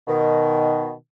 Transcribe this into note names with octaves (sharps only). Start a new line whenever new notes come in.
B2 D#3